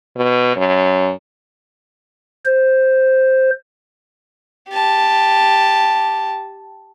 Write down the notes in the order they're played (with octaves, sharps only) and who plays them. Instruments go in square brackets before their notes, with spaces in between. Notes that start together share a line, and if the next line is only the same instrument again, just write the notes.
[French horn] B2
F#2
[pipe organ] C5
[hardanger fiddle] G4 A5